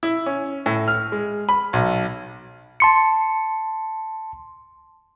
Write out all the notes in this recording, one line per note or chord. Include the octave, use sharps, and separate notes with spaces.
E4
C#4
A2
F6
G#3
B5
B1
A5 C6 C#7